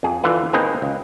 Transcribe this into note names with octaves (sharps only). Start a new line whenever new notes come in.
F2 G#4
D3 E3 F4 B4
D#3 A#3 C4 D#4 G#4 B4
C#2